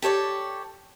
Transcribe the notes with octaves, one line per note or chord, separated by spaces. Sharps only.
G4 A4 C#5 D5